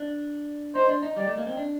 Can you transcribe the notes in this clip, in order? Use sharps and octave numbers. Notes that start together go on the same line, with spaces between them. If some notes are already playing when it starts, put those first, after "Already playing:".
Already playing: D4
D#4 C5
D4
D#4
G3 D5
A3
A#3
C4
D4